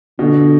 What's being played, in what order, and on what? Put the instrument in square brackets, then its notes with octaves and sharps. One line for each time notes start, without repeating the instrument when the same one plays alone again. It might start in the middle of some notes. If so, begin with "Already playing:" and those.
[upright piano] B2 [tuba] D3